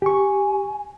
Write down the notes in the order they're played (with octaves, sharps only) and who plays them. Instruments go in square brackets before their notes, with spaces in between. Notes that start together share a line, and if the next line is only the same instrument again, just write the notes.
[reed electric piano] G4 C#6 [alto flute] G#5